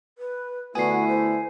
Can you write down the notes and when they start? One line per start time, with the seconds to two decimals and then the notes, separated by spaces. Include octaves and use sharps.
0.18 B4
0.75 D3 A3 B3 E4 F#4 G#5 C7
1.08 C5